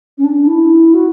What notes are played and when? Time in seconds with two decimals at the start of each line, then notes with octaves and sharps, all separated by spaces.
0.18 C#4
0.24 D4
0.35 D4
0.47 E4
0.94 F#4